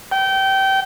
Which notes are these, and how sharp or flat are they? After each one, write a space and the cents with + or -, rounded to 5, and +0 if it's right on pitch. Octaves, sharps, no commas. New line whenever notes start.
G5 -25